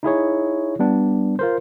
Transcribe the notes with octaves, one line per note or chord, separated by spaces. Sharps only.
D#4 E4 G#4 C#5
G3 B3 D4
F4 A#4 C5